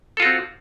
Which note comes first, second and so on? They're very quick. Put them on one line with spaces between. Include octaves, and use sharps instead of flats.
A4 F4 F#4 C4